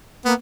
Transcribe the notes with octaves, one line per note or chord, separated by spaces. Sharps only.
A#3 B3